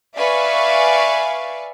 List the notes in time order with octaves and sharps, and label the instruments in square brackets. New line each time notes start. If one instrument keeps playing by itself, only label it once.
[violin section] B4 D5 E5 F5 G#5 C#6